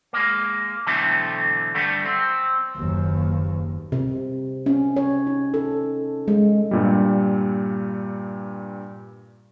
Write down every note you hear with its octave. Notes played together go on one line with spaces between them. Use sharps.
G#3 A#3
B2 D3 E3 F#3 A3 C4
G2 D3 G3 A3
C4
F#1 D#2
C3
C#4
C#5
D#4
A4
G#3
G2 A#2 G3